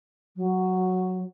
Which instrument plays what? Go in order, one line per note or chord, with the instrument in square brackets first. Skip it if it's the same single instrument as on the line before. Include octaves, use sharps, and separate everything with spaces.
[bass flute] F#3